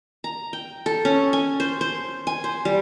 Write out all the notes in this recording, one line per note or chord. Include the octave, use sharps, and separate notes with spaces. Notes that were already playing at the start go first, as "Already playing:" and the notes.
A#5
G5
A4
C#4
G#5
C5
C5
G#5
C5
G3